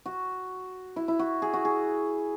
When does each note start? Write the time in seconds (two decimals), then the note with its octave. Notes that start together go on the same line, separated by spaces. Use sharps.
0.06 F#4
0.96 E4
1.08 E4
1.19 F#4
1.42 G#4
1.54 F#4
1.65 G#4